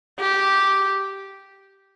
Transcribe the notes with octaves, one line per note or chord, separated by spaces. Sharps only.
G4